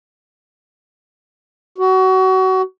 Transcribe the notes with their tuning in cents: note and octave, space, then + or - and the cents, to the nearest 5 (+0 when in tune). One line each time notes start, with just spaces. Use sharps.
F#4 +25